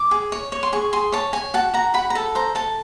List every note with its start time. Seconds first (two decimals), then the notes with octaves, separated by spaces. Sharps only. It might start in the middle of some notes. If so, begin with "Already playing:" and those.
Already playing: D6
0.11 G#4
0.32 C#5
0.52 C#5
0.63 C6
0.72 G#4 C#6
0.93 G#4 C6
1.12 C#5 A5
1.33 C#5 G#5
1.54 F#4 A5
1.74 F#4 A#5
1.94 F#4 B5
2.10 A#5
2.15 A4 A5
2.35 C5 A#5
2.55 A4 A5